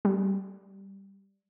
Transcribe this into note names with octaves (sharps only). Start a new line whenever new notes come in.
G3